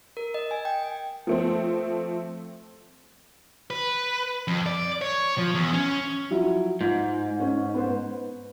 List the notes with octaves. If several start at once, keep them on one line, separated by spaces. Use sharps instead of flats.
A#4
D#5
G#5
G5
F3 A3 C4
B4
F2
D5
C#5
F3
E2
C#4
F3 F#3 E4
G#2 F4
C#4
B3 B4 C5